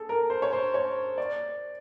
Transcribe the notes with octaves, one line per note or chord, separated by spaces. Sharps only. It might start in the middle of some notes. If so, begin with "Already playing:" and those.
Already playing: G#4 A4
A#4
C5
C#5
C5
C#5
D5